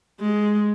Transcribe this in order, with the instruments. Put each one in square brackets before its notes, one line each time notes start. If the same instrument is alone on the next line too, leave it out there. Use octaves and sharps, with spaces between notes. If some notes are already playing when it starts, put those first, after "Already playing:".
[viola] G#3